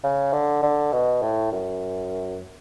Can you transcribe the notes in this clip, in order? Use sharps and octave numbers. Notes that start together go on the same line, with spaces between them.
C#3
D3
D3
B2
A2
F#2